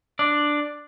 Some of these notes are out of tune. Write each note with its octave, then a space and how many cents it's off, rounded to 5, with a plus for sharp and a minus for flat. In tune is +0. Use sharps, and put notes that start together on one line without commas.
D4 +5 D5 +5